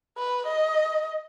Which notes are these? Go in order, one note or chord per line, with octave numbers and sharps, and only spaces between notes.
B4
D#5